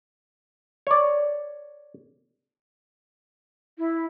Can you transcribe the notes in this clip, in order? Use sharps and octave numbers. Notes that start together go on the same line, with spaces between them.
C#5 D5
E4